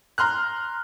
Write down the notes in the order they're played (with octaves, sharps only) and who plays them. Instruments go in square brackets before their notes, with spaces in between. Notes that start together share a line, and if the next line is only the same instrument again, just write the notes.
[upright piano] A#5 C6 F6 F#6